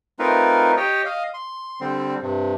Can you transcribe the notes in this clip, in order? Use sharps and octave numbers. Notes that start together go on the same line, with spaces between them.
A3 C4 D#4 F4 A#4 B4
G4 C#5 D#5 G5
D#5 F5
C6
D3 G3 C4
G2 C3